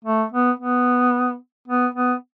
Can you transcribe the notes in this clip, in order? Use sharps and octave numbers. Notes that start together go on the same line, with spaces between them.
A3
B3
B3
B3
B3